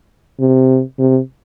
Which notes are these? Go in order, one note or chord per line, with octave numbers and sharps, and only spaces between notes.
C3
C3